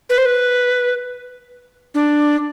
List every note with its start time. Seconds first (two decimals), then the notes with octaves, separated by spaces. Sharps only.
0.10 B4
0.18 C5
0.26 B4
1.95 D4